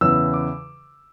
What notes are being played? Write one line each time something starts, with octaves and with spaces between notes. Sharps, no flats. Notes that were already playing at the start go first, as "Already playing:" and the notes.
E2 C#3 E3 E6
D6